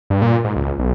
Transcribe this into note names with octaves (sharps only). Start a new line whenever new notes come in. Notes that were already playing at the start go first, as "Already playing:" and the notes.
G2
A#2
G#2
C#2
B1